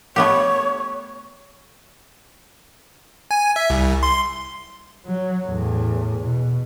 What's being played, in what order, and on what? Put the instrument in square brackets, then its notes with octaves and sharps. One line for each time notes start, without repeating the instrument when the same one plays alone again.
[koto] A3 B3 G4 [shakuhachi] C#5
[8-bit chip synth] G#5
G#5
E5
C2
C6
[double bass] F#3
E2 A2
B2